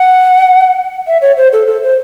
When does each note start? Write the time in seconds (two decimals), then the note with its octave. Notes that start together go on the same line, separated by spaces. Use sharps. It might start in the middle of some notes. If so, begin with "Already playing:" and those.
Already playing: F#5
1.07 E5
1.22 C#5
1.37 C5
1.53 A4
1.67 A4
1.82 C5